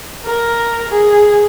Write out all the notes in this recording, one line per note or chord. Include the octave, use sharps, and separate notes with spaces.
A#4
G#4